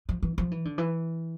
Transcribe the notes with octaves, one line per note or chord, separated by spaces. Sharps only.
F3
E3
F3
E3
D3
E3